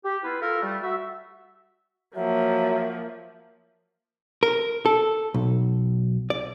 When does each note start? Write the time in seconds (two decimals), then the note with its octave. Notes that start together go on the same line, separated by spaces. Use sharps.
0.05 G4
0.24 B3 E4 F4 B4
0.41 F4 A4 A#4
0.62 G3 A3
0.83 F#4 E5
2.16 F3 F#3 A#3 E5
4.43 A#4
4.86 A4
5.34 B1
6.30 D5